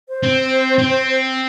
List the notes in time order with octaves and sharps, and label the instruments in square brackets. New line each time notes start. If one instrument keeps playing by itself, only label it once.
[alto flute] C5
[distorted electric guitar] C4
C4